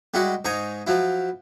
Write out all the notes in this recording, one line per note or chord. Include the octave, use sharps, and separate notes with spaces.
G3 G#3 E4 F#4
G#2 D#4 C#5 G#5 A#5
F3 F#3 E4